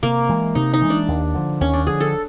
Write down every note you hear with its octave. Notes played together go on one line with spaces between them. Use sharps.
C3 A#3
E3 G#3
C3 D#4
D#4
E3 G#3
D4
D#2
D3 F3
D#2 C#4
D4
D3 F3 G#4
A4